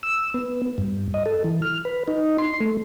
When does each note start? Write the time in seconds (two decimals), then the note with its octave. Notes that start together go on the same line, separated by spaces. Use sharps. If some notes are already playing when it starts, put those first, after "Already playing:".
0.03 E6
0.34 B3
0.78 G2
1.14 D#5
1.26 A4
1.44 E3
1.62 F6
1.85 B4
2.08 D#4
2.38 C6
2.60 A3